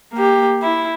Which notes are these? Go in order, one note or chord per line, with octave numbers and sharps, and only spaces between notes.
A#3 G4
E4